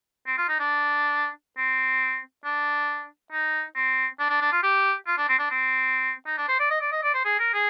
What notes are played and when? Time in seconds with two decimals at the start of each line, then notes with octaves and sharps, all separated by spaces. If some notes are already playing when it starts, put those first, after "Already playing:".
0.27 C4
0.38 F4
0.49 D#4
0.59 D4
1.58 C4
2.45 D4
3.32 D#4
3.75 C4
4.20 D4
4.30 D4
4.41 D4
4.52 F4
4.63 G4
5.07 F4
5.18 D4
5.29 C4
5.39 D4
5.50 C4
6.27 D#4
6.38 D4
6.48 C5
6.59 D5
6.70 D#5
6.81 D5
6.92 D#5
7.03 D5
7.14 C5
7.25 G#4
7.39 A#4
7.54 G#4